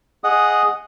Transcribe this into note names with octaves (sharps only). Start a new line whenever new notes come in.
G#4 D#5 F#5 D#6